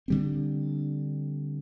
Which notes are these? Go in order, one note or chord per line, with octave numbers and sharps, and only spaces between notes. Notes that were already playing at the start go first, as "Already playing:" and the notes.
D3 G3 C4